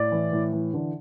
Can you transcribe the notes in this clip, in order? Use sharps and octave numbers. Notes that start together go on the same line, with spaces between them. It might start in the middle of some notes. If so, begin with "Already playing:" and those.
Already playing: A2 D5
E3
A2
E3
D3